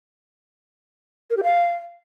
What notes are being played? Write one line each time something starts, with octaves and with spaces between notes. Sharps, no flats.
A#4
G4
F5